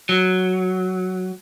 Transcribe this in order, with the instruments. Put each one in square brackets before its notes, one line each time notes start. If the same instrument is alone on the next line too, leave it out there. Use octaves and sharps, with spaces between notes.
[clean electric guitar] F#3